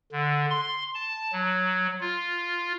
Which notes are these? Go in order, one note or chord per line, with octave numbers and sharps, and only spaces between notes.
D3
C6
A5
F#3
F4